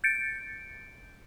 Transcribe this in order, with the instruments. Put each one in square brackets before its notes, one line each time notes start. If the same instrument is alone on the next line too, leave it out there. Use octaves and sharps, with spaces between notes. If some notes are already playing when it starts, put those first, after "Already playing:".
[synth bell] G6 A6 C#7 D7